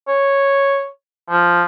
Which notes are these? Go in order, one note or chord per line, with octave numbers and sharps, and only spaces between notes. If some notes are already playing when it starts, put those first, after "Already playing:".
C#5
F3